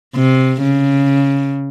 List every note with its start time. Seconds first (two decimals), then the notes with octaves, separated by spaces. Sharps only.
0.16 C3
0.62 C#3